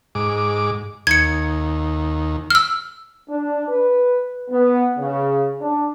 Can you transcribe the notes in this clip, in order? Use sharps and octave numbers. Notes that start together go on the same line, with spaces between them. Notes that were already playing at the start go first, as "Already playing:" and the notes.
G#2 D6
D#2 G#6 C#7
E6 F6
D4
B4
B3
C#3
D4